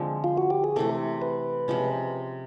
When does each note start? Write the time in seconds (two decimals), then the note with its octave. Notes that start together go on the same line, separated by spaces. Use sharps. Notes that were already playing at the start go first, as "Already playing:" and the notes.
Already playing: D3 F3 G#3 C4
0.24 F4
0.38 F#4
0.50 G4
0.64 G#4
0.76 C3 E3 A3 A4
1.22 B4
1.68 C3 F3 G#3 C#4